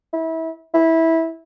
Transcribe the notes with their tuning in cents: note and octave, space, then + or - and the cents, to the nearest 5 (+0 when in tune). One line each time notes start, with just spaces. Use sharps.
E4 -25
E4 -15